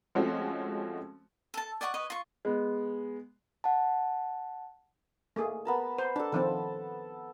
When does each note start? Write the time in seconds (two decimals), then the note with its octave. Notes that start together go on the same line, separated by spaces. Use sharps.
0.15 F3 G#3 A3 C4 C#4 F#4
1.54 A4 A5
1.81 D5 D#5 F#5 C#6
1.94 B4 C#5 D#5
2.10 F4 C#6
2.45 G#3 B3
3.64 F#5 A5
5.36 A3 A#3 G#4
5.65 B3 A#4 A5
5.98 C5
6.16 D4 A4 A5
6.32 D#3 F3 C4 A4